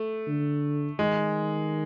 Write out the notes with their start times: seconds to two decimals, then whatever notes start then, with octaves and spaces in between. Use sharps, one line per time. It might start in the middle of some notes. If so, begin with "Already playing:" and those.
Already playing: A3
0.27 D3
0.99 D#3 G#3